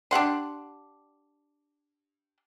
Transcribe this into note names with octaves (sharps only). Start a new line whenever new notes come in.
D4 G4 F#5 C6